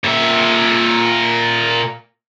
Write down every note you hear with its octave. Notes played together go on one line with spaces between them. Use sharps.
A#2 E5